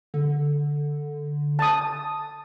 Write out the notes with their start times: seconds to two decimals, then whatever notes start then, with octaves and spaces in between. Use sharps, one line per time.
0.14 D3
1.59 A5 D#6